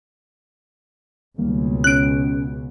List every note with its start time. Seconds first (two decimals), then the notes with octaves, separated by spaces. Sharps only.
1.38 C#2 B2 D#3 G3 A#3
1.84 C#4 F#6 D7